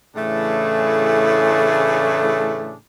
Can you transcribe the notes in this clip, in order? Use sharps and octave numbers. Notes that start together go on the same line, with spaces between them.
A2 C#3 E3 A3 D4 G#4